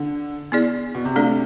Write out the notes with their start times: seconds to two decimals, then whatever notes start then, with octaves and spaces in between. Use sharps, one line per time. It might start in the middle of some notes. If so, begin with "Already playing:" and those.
Already playing: D3
0.52 B3 E4 G#4 D5
0.95 B2
1.05 C3
1.16 A3 D4 A4 D5